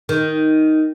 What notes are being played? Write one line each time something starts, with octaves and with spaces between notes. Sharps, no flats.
D#3